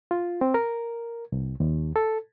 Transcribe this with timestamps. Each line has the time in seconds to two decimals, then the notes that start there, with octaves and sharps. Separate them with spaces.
0.11 F4
0.41 C4
0.54 A#4
1.32 C2
1.60 D#2
1.96 A4